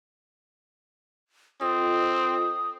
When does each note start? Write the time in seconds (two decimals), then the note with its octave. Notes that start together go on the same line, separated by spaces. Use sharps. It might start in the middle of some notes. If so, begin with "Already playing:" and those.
1.61 C4 F4 A4 D#5 D#6